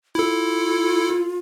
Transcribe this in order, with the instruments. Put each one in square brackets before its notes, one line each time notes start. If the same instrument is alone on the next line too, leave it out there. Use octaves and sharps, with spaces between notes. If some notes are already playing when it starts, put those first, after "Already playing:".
[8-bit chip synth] E4 A4 [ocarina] F4